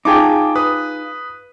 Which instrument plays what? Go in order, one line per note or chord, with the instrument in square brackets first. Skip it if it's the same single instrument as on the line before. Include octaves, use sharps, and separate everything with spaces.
[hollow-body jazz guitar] D#4 F4 G#4 [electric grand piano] G5 A5 D6
[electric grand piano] B4 D#6